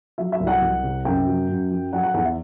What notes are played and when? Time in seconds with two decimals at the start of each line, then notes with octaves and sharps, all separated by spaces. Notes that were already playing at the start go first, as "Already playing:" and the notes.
0.18 F#3 E5
0.32 E5
0.40 C2
0.47 F#5
0.61 C2
0.83 C3
1.05 F#2 G5
1.27 F#3
1.49 F#2
1.71 F#3
1.92 F#3 F#5
2.03 F#5
2.14 E2 F#5
2.25 E5